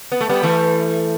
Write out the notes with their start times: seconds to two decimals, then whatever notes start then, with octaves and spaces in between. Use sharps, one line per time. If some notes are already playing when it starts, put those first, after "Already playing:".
0.12 B3
0.21 A3
0.29 G3 B3
0.43 E3 A3